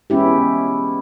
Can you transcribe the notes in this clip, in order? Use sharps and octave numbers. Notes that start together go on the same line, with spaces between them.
G#3 B3 C#4 E4 G4